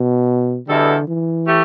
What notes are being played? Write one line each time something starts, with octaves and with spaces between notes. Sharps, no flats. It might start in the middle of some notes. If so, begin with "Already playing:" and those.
Already playing: B2
E2 B2 D3 G3 E4 A4
E3
A3 G4